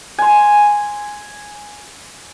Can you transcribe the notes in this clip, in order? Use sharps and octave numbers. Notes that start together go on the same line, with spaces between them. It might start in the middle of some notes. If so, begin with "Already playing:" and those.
G#5 C6